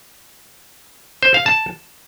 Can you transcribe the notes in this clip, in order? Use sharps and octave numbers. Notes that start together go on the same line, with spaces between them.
C5
F5
A5